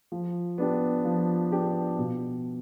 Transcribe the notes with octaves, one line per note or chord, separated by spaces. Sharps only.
F3
B3 D4 G4
F3
B3 D4 G4
B2